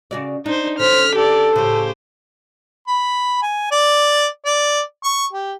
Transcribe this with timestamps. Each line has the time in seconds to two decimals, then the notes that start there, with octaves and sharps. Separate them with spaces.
0.11 C#3 F#4 D5
0.46 D4 D#4 C5
0.79 D3 C#4 C5 F6 B6
1.16 G4 A4 D5
1.56 A2 C#3 G4 C5
2.87 B5
3.42 G#5
3.71 D5
4.45 D5
5.04 C#6
5.33 G4